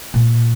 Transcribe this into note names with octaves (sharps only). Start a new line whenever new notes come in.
A#2